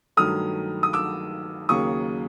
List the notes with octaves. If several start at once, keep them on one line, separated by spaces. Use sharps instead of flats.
G2 D#3 F#3 A3 D#6 F6
D#6
D6 E6
D#2 C#3 F#3 A#3 C#6 D#6